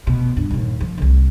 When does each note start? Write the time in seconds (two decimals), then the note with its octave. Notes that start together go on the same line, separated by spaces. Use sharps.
0.07 B2
0.37 G2
0.51 D#2 A#2
0.81 F3
0.98 D1 C2